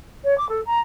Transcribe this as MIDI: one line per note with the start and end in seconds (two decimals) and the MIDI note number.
0.24 0.37 73
0.38 0.48 86
0.49 0.61 69
0.66 0.80 82